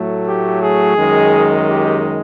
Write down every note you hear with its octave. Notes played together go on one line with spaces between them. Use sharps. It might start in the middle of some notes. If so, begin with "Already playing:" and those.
Already playing: A2 F#3 A3
G4
G#4
F#2 D#3 G#3
G4